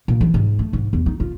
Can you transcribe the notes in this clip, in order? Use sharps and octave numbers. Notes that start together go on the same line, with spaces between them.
A#2
E3
G#2
A3
G#2
E2
D#4
F4